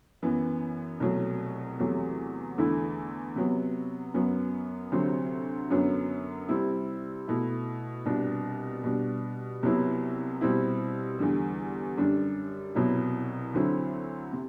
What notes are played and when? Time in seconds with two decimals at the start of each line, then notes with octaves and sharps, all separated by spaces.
0.22 F#2 E3 B3
1.00 C2 B2 F#3 A3
1.80 E2 C3 F#3 A3
2.58 E2 D3 A3 E4
3.36 C3 F#3 B3
4.14 F#2 F#3 B3
4.92 D2 C3 F#3 C4
5.70 F#2 D3 F#3 B3
6.49 C3 G3 C4 E4
7.27 B2 A3 E4
8.06 C2 B2 G3 D4
8.84 B2 G3 D4
9.63 C2 C3 F#3 B3 E4
10.41 B2 G3 C4 E4
11.19 E2 D3 G3
11.97 F#2 D3 G3 D4
12.75 C2 B2 F#3 B3 E4
13.54 D2 D3 F#3 C4 E4
14.33 C3